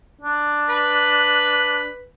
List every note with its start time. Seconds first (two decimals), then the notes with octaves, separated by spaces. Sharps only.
0.21 D4
0.69 B4